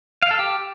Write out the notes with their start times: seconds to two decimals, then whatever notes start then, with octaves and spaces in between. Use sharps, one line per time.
0.22 F5
0.31 A4
0.39 G4